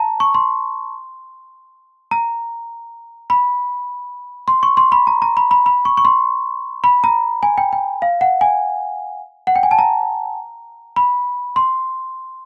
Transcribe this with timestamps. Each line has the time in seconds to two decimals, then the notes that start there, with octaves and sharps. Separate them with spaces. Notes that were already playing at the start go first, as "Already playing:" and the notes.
Already playing: A5 A#5
0.20 C#6
0.35 C6
2.11 A#5
3.30 B5
4.48 C6
4.63 C#6
4.77 C6
4.92 B5
5.07 A#5
5.22 A#5
5.37 B5
5.51 B5
5.66 B5
5.85 C#6
5.97 C#6
6.05 C6
6.84 B5
7.04 A#5
7.43 G#5
7.58 G5
7.73 G5
8.02 F5
8.21 F#5
8.41 G#5
9.47 F#5
9.56 G5
9.63 G#5
9.71 A5
9.79 A#5
10.96 B5
11.56 C6